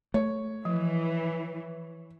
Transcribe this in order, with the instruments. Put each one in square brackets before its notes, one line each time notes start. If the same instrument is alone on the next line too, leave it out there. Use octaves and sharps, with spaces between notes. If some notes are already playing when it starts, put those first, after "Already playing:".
[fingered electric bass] A3 [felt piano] C#5
[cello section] E3 [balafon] F3